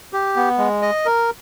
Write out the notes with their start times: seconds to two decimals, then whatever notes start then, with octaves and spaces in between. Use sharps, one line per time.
0.13 G4
0.36 B3
0.58 G#3
0.82 D#5
1.06 A#4